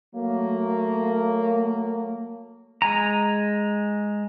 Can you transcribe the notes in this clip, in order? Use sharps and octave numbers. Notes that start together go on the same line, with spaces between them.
F#3 A3 A#3
G#3 G#5 A#5